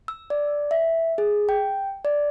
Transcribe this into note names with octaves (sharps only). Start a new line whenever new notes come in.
E6
D5
E5
G#4
G5
D5